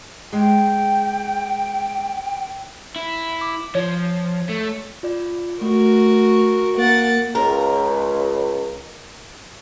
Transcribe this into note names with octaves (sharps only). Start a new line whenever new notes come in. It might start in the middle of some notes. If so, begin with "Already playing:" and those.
G#3 G5
E4
D6
F3 C#5
A3
F4 D5
A3 F#4 A#4
A#3 F#5 A6 D7
C#2 A#4